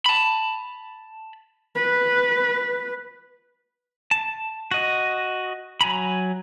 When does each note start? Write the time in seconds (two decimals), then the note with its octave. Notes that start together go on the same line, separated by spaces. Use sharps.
0.06 A5 B5
1.76 B4
4.11 A5
4.71 F#4 D#5
5.81 F#3 G#5 A#5 B5